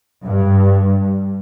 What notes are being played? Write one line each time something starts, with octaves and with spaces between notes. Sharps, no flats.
G2